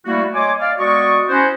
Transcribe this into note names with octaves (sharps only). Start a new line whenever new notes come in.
G3 A3 A#3 E4 F#4
C#5 D#5 G#5 C6 D6
D5 F5
G#3 B3 F#4 D5 D#5 C#6
C#4 E4 F#4 C5